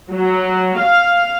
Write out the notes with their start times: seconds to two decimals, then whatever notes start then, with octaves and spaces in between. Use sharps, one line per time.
0.11 F#3
0.78 F5